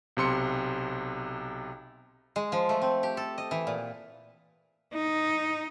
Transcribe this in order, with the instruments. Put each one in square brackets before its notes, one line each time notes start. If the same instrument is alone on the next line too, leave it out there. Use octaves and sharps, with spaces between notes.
[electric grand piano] B1 C3 C6 C#7
[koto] G#3
F3
A3
C4
G4
A4
D#5
E3
A#2
[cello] D#4